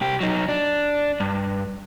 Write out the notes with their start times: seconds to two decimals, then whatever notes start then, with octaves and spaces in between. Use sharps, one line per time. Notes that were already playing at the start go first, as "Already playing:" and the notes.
0.01 C2 G4
0.21 F#3 D#4
0.49 D4
1.20 G2